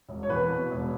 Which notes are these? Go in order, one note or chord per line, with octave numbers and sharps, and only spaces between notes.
E1
C#5
E2 B4
B2
E1